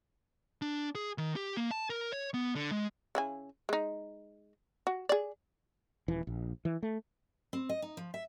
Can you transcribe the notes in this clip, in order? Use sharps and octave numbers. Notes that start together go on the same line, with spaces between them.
D4
G#4
D#3
G4
A#3
A5
A#4
C#5
B3
D3
G#3
C#3 E4 G#5
G#3 D#4
F#4
G#4 D5
D#1 E3
A#1
E3
A3
C4
D#5
D#4
F3
E5